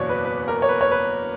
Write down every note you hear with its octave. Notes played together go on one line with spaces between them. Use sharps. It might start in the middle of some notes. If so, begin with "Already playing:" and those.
Already playing: F#1 E2 B2 C#5 D5
B4
B4
A#4
C#5
B4
C#5
B4